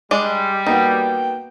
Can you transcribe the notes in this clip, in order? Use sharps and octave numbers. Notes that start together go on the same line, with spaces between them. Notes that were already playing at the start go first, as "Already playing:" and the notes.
G3 G#3 D4 D5
A#3 B3 D#4 F#4 G5